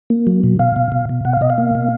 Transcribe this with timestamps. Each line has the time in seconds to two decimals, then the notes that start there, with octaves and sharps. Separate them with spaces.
0.10 A#3
0.27 F#3
0.44 B2
0.59 B2 F5
0.76 B2
0.92 B2
1.09 B2
1.25 B2 F#5
1.33 F5
1.41 B2 D#5
1.50 F5
1.58 A#3
1.75 B2